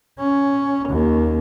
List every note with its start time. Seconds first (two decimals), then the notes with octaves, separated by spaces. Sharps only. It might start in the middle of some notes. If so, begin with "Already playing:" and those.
0.19 C#4
0.89 D#2